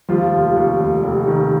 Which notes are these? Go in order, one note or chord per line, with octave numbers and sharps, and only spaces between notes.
D#2 F3 F4
F1
D#2
F1
F1
D#3